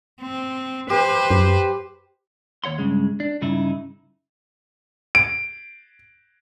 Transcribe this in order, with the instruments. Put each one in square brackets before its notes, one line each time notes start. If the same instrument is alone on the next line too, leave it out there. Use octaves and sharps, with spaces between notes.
[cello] C4
[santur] G4 [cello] B4 C5
[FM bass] F#2
[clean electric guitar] D#2 C#5 F#5 C6
G2 C#3 G#3
D4
G2 C#3 D#4 E4
[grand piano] D7